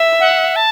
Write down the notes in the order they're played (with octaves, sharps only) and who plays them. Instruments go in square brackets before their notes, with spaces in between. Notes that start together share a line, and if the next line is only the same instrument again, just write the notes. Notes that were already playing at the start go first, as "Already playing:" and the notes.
Already playing: [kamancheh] E5
[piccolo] F#5
A5